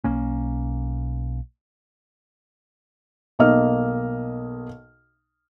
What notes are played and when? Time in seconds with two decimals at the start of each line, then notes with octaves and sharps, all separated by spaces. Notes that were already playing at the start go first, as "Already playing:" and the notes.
0.04 B1 A#3 C#4
3.39 B1 A#3 D#5 F6